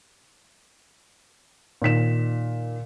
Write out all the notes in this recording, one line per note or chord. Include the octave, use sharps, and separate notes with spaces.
A#2 D#3 B6 E7